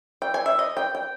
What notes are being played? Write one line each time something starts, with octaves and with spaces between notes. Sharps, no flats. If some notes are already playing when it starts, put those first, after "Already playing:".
G5
G#5
E5
D#5
G5
G5